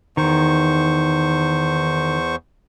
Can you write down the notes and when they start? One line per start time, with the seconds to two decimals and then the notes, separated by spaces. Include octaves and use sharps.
0.17 E2 D#3 C5 C#6